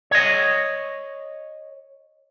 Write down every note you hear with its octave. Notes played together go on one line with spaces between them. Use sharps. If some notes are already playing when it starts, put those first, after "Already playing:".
C#5 D#5